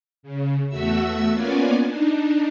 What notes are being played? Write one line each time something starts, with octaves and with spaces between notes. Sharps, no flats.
C#3
E2 A3 F#4 E5 E6
A#3 B3 C#4 F4 D5 G#5
D4 D#4